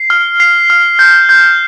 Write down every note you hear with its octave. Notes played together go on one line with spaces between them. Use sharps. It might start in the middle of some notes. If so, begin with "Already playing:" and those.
Already playing: C7
F6
C7
F6
G6
G6